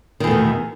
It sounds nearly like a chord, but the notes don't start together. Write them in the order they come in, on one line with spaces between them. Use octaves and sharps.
D#3 E2 A3 B2